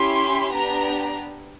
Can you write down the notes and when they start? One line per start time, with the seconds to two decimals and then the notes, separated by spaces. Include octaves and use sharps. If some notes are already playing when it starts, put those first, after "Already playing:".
Already playing: C#4 E4 G4 C6
0.52 B3 D4 G4 A#5